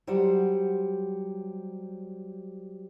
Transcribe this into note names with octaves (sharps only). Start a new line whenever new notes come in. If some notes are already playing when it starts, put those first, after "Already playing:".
F#3 G3 C5 F#5